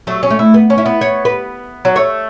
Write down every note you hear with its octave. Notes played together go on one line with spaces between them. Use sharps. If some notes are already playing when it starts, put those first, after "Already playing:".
F#3 A3
C#4
A3
E4
B3
C#4
E4
B3
C#5
B4
F#3
A3 C#5